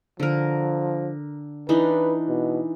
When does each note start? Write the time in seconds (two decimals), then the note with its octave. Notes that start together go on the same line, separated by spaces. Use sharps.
0.20 D3 F3 A#4
1.69 E3 D4 D#4 B4
2.28 B2